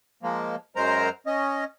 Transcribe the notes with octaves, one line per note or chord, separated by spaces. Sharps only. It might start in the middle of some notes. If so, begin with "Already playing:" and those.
F3 G#3 A#3
F#2 F#3 G#3 A#4 C5 A#5
C#4 D#5